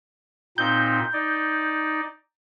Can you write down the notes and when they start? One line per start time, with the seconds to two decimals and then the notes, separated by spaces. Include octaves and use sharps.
0.58 A#2 C4 D#4 G6
1.13 D#4 D5